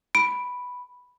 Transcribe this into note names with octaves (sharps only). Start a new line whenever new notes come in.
B5 D7